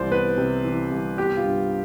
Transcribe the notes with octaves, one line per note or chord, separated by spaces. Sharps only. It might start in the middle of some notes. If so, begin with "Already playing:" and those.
Already playing: C2 E3 C5 D5
B3 B4
C3
E3
C2
B3 G4
F4
G2